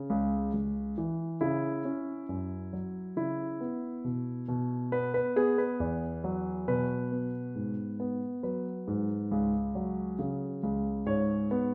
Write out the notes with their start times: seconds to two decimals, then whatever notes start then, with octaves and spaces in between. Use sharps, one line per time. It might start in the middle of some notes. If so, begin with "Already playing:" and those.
Already playing: C#3
0.10 C#2
0.53 C#2
0.98 E3
1.41 C#3 E4
1.85 C#4
2.29 F#2
2.73 F#3
3.16 C#3 E4
3.61 B3
4.05 B2
4.48 B2
4.92 B3 B4
5.14 B4
5.36 B3 G#4
5.58 B4
5.80 E2
6.24 F#3
6.68 B2 B4
7.12 B3
7.55 G#2
8.00 B3
8.43 F#3 B4
8.88 G#2
9.31 C#2
9.75 F#3
10.19 C#3
10.63 C#2
11.06 G#2 C#5
11.51 B3